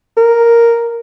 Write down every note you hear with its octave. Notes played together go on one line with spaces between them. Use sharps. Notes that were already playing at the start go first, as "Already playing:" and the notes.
A#4